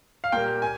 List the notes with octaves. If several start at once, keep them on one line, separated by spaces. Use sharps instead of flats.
F5
A#2 G3 A#3 G5
G#5